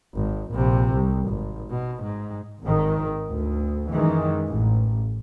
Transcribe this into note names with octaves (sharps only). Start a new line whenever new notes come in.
G#1
A#1 C3
C2
G#1
B2
G#2
G#1 D#3
D2
F#2 D#3 E3 G#3
A1